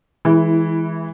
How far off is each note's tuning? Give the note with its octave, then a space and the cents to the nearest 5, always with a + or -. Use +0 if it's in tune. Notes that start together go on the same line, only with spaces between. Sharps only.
E3 -20 G#3 +0 E4 +5